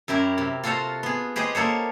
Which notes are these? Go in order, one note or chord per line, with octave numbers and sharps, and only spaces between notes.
F#2 E4 G4 A#4
C3
F4 F#4 A4 C5 F5
B3 G#4
G4 G#4 B4 C5 D#5
A#3 A4 C5 C#5